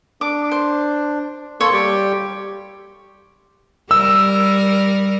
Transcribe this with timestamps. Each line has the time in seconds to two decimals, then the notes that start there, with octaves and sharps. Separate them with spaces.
0.21 D4 D6
0.52 C5
1.61 A#3 A4 C#5 C6
1.73 G3 G4 G5
3.91 G3 A#4 E6